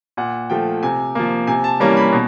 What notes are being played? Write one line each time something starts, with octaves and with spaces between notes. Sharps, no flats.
A#2 F#5
F3 A3 G5
C3 G#5
F3 A#3
C3 G#5
A5
E3 G3 A#3 C#4 A#5
B5
B2